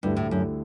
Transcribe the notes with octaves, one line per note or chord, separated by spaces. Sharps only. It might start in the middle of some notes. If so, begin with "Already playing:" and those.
D2 G2 D3 A3 E4 G4
A2
F#2